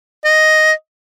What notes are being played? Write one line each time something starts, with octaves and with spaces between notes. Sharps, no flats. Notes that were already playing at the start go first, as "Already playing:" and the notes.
D#5